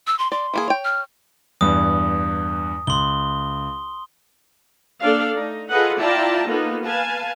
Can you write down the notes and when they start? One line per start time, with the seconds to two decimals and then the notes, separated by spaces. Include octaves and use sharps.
0.07 E6
0.19 C6
0.32 D5 C6
0.54 E3 A#3 G#4
0.68 C#5 G5
0.85 F6
1.61 E2 G2 D#6
2.87 C#2 C6 G7
5.01 A#3 D4 A4 D5 F5
5.35 A3 D#4
5.69 F4 G#4 A4 B4 D#5 F#5
6.00 E4 F4 D5 G5 A5 A#5
6.47 A#3 B3 D#4 F4 A4
6.86 B4 F5 G#5 A5